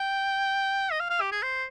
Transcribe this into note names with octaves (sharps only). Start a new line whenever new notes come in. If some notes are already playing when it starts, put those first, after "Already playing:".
Already playing: G5
D#5
F5
F5
G4
G#4
C5